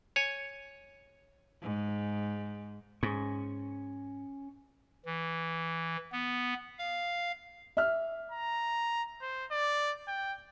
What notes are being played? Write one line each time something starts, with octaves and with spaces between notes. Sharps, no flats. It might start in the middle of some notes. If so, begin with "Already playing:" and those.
C#5 G#5
G#2
G#2 C#4 C#6
E3
B3
F5
E5 F6
A#5
C5
D5
G5